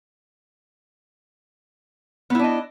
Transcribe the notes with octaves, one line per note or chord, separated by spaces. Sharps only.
B3 D4 E4 D#5